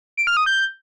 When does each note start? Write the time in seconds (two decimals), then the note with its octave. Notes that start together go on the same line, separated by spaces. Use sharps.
0.17 D7
0.27 F6
0.37 D#6
0.46 G6